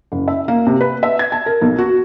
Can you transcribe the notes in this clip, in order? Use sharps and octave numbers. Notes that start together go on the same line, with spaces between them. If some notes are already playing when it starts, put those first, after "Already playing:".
F#1
E5
A#3
C3
B4
E5
G#6
A5
A#4
B1
F#4